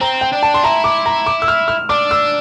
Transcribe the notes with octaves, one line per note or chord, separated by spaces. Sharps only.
C4 A#5
G5
D4
A5
C6
E4 A#5
D6
A#5
D6
E6
F6
F6
D4 D6
E6